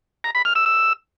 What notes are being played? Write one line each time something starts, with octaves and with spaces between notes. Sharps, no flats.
A#5
B5
F6
E6
E6